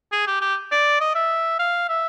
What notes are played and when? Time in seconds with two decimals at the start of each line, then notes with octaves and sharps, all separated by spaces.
0.12 G#4
0.27 G4
0.41 G4
0.71 D5
1.01 D#5
1.15 E5
1.59 F5
1.89 E5